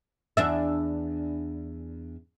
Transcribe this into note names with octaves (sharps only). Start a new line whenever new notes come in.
E2 D4 E5